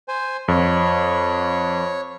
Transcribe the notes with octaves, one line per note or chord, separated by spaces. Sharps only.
C5 G#5
F2 C#5